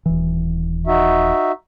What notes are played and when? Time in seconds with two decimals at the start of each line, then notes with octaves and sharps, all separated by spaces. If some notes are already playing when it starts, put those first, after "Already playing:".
0.06 D#1 E3
0.87 D#4 F#4 E5